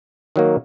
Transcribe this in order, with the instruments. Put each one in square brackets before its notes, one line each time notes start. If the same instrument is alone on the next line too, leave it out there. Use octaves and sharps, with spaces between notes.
[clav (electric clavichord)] D#3 F#3 A#3